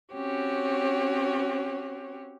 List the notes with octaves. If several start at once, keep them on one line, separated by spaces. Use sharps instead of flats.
C4 C#4 F#4 G4 C#5